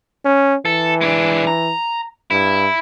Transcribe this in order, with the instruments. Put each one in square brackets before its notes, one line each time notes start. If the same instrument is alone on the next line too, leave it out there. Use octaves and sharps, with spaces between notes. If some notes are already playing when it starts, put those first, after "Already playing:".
[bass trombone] C#4
[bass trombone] E3 [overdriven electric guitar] A4
[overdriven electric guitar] G#3 D4
A#5
[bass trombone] G2 [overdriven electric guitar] E4